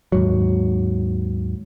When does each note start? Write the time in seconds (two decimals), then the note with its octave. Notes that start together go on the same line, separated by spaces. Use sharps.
0.12 D#2 G#2 F#3